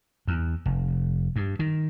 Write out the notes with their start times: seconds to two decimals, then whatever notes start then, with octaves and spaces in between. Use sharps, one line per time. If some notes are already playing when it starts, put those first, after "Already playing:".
0.28 E2
0.66 F1
1.36 G2
1.59 D#3